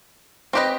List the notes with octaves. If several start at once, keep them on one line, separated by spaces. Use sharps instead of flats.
C4 G4 B4 D#5